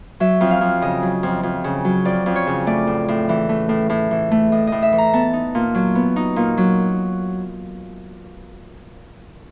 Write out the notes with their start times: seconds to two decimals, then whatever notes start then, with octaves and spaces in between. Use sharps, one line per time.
0.20 F#3 E5
0.41 F2
0.51 F5
0.61 F2
0.82 C#3 D#5
1.02 F#3
1.23 F2
1.43 F2
1.64 C#3
1.85 F#3
2.05 F2 D5
2.26 F2
2.36 C#5
2.47 C#3
2.66 A3 D5
2.87 A2
3.08 A2
3.29 E3
3.49 A3
3.69 A2
3.90 A2
4.11 E3
4.31 A3
4.52 A2 D#5
4.67 A2 D#5
4.83 E5
4.93 E3
4.98 A#5
5.13 B3 A5
5.33 D#4
5.55 A#2
5.75 F#3
5.95 B3
6.16 D#4
6.36 A#2
6.57 F#3